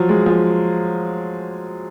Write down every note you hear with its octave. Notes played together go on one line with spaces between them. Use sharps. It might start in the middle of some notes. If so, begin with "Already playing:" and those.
Already playing: F3 F#3
G#3
F3